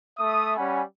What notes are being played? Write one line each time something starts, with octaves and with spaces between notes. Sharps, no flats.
A3 E5 D#6
G3 C#4 F#5 G#5 B5